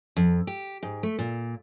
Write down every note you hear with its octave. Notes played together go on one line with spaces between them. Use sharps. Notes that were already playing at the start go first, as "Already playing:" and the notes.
F2
G4
G#2
A3
A#2